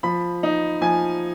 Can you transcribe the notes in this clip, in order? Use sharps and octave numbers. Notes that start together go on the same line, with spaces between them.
F3 B5
D#4
F3 G#5